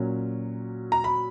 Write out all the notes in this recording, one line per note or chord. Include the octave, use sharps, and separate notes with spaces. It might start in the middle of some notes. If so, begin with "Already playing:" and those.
Already playing: A#2 F#3 C#4
A#5
B5